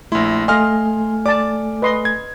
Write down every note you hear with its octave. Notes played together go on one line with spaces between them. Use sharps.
A#1 A3 E4 C6
A3 A4 D#5 F5 G#5 C6 F6
D5 A5 D6
B4 D#5 C6
G#6